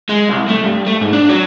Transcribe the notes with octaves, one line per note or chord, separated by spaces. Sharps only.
G#3
C2
A3
G2
A3
G#2
D4
F#3